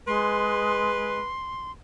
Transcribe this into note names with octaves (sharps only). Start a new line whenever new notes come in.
G#3 B4 C6